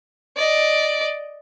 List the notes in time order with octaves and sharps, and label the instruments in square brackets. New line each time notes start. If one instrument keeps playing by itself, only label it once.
[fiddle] D5 D#5